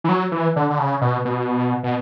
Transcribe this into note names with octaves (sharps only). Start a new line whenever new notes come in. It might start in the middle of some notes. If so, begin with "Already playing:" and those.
E3
F#3
E3
D3
D3
C#3
B2
B2
B2